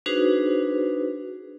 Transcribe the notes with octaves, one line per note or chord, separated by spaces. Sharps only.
D4 D#4 F#4 G#4 B4 C5